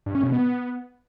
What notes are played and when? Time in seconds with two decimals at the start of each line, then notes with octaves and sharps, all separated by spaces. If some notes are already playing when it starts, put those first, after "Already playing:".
0.06 G2
0.15 C#4
0.24 B2
0.32 B3